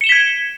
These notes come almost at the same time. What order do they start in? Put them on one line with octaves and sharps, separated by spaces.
C#7 E7 G7 B6 G#6